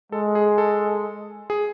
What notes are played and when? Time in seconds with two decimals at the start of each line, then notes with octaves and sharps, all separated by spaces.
0.12 G#3 A4
0.35 G#4
0.58 A4
1.50 G#4